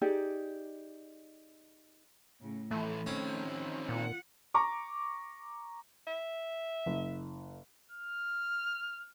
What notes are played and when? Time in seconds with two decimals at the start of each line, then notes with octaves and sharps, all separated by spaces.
0.02 D#4 G4 G#4 D5
2.40 A2 C#3
2.71 A2 E3 F3 A3
3.06 D#3 C4 C#4
3.89 A#2 F4 F#5
4.54 A#5 C#6 D6
6.07 E5
6.86 F#1
7.91 F6